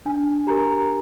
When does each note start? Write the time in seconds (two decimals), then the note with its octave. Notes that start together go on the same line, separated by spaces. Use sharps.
0.06 D4 G#5
0.47 G4 A#4 A#5